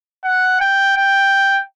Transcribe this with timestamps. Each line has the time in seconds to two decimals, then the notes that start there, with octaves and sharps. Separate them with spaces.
0.24 F#5
0.61 G5
0.97 G5